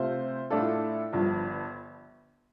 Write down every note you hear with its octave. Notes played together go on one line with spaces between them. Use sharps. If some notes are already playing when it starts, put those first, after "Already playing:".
Already playing: C3 A3 F4 C5
A2 A3 D4 F4 A4
G1 G2 F3